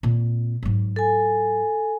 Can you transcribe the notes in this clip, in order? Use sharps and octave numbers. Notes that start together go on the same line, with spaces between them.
A#2 C4
G#2 F#3
A4 G#5